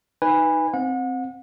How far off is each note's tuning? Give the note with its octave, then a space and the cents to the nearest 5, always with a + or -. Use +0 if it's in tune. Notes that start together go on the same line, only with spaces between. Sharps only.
D#4 +0 B4 +0 G#5 -25
C4 +0 F#5 -35